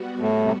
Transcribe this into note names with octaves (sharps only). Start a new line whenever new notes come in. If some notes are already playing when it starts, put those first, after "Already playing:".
Already playing: G3 B3 F#4
A2
C3